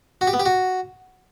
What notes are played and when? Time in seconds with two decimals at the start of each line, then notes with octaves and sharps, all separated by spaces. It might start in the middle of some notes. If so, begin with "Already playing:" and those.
0.21 F#4
0.27 G4
0.33 B3
0.39 G4
0.46 F#4